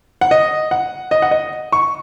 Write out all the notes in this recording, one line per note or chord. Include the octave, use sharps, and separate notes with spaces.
F#5
D#5
F#5
D#5
F#5
D#5
C#6